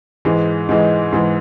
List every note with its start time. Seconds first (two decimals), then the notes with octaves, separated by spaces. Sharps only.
0.25 G#2 E3 G#3
0.69 G#2 E3 G#3
1.12 G#2 E3 G#3